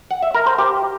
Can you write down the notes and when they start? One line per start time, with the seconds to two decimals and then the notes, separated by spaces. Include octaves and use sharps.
0.11 F#5
0.23 E5
0.35 A#4
0.47 C5
0.58 G4